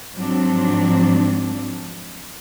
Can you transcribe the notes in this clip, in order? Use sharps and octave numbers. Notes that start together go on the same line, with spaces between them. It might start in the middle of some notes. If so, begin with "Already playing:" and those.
G#2 F3 F#3 C4 D4